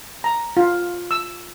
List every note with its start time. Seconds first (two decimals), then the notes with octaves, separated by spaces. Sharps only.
0.24 A#5
0.57 F4
1.11 E6